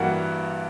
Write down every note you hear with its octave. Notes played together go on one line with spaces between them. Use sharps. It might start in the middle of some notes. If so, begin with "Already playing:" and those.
Already playing: G2 E3 G3 A#3 F#4 F#5